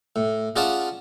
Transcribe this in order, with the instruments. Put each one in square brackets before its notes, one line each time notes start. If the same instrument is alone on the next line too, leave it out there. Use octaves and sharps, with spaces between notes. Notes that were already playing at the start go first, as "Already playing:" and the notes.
[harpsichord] A2
C#4 F4 G#4 D5 F#5 A5